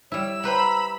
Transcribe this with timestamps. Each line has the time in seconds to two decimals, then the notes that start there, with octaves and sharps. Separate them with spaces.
0.12 G3 E4 C#5 E6
0.44 G4 B4 C5 A#5 B5